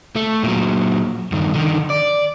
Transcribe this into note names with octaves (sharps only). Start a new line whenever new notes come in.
A3
A#2 F#3
G2 D#3
D3 D#3
D5